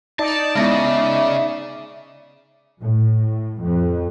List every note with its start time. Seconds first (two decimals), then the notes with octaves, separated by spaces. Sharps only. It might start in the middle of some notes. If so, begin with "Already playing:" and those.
0.19 D#4 D5 A5
0.55 C#3 G#3 B3 E4 E5
2.81 A2
3.61 F2